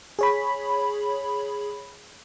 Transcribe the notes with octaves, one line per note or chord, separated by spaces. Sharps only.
G#4 C#5 B5